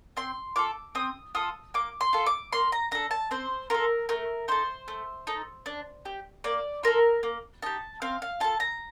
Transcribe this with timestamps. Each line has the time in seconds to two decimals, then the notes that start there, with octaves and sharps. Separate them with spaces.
0.17 C4 C6
0.56 F4 A4 D6
0.95 C4 D#6
1.35 F4 A4 D#6
1.74 A#3 D6
2.01 C6
2.13 F4 A4
2.26 D6
2.52 A#3 C6
2.72 A#5
2.91 D4 A4 A#5
3.11 A5
3.31 C4 C5
3.70 F4 A4 A#4
4.09 A3 A#4
4.48 D#4 A4 C5
4.88 A3
5.27 D#4 A4
5.66 D4
6.05 G4
6.44 A#3 D5
6.83 F4 A4 A#4
7.23 A#3
7.62 D#4 G4 A5
8.02 C4 F5
8.22 F5
8.40 F4 A4 A5
8.60 A#5